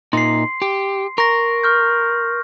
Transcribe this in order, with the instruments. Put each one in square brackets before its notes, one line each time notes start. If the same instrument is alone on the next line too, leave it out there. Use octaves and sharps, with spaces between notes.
[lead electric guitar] A#2 D#4 [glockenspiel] C6 C7
[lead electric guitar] G4
[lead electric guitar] A#4 [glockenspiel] C#6 A#6
[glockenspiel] C#6 F6 G6